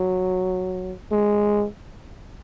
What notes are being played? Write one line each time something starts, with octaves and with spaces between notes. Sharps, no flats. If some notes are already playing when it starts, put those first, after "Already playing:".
Already playing: F#3
G#3